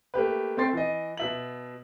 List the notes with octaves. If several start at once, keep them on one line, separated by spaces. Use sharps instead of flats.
A3 A#3 G4 B4
A3 C4 G5 C6 A6 C7
E3 D#5
B2 E5 F#7